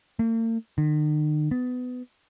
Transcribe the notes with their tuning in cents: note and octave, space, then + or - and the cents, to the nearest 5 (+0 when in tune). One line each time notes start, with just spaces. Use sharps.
A#3 -45
D#3 -45
B3 +20